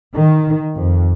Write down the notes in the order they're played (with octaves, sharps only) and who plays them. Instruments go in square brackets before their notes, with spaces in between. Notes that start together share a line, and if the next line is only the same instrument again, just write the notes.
[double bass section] D#3
F2